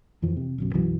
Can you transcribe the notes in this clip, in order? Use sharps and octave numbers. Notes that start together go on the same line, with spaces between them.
F2 E3 F3
C3
D1 B1 F#2
B1 F#2 E3 F#3